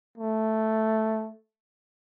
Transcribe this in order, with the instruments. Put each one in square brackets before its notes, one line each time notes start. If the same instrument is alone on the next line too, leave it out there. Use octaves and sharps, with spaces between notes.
[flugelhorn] A3